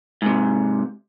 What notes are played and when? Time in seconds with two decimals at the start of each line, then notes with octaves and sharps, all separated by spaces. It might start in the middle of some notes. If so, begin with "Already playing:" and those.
0.22 G#2 C3